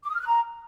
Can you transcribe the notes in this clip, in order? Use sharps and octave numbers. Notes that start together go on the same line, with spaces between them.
D6
D#6
F6
F#6
A#5